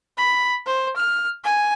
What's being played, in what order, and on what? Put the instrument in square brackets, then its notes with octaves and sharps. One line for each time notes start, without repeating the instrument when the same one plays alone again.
[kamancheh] B5
C5
F6
G#5